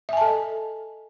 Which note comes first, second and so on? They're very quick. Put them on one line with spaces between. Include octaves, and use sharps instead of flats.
E5 G#5 A5 A4 D#5